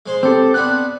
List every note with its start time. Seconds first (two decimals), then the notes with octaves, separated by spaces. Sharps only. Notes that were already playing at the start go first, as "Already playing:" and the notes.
0.06 G#3 C5 C6
0.23 C4 G4 A4
0.54 B3 C4 D4 F#6